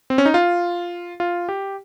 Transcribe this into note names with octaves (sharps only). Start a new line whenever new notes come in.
C4
C#4
D#4
F4
F4
G4